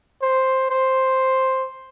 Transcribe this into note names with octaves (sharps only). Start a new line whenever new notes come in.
C5
C5